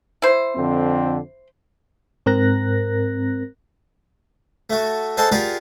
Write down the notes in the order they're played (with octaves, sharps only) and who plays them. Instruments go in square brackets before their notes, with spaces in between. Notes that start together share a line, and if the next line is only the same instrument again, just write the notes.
[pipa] E4 C5
[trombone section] F2 D3 C4
[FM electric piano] G#2 C4 A#4 F#6 A#6
[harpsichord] A3 F#4
G#4 A4 C5 D#5 F#5 A5
F4 G4 G#4 A#4 D5 F#5